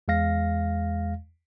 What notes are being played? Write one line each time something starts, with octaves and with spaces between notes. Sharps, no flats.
E2 G#3 F5 A#6